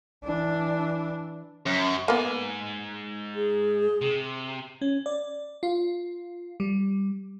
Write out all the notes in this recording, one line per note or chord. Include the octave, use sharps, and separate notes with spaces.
E3 D4
F#2
G#2 A#3 B3 G#5
G#4
C3
C#4
D5
F4
G3